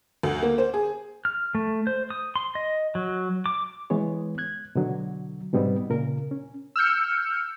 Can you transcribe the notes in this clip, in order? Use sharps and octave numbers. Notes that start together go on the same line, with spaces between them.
D2
A#3
C5
G#4
F6
A3
C5
D#6
C6
D#5
F#3
D6
E3 G#3 B3 C#5
F#6 G#6
B2 D3 F#3
G#2 B2 G3 B3 C4 D#4
A#2 C#3 A#4
C#4
E6 F6 G6 C#7